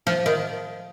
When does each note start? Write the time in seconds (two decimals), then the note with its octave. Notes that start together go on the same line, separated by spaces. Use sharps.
0.07 F3
0.26 D#3